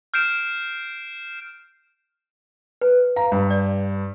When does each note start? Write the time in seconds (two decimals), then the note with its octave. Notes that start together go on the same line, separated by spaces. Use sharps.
0.14 F6 G6 C7 D7 E7
2.81 B4
3.16 F5 A#5
3.32 G2
3.50 D5